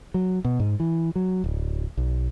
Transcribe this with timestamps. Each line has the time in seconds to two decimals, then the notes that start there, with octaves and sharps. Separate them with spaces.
0.14 F#3
0.45 B2
0.60 G#2
0.80 E3
1.16 F#3
1.44 D1
1.97 B1